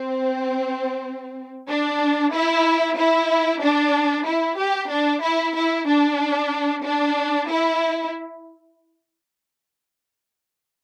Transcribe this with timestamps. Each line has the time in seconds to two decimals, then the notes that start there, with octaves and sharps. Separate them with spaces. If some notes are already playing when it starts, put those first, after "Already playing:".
Already playing: C4
1.68 D4
2.32 E4
2.97 E4
3.61 D4
4.25 E4
4.58 G4
4.90 D4
5.22 E4
5.55 E4
5.87 D4
6.84 D4
7.48 E4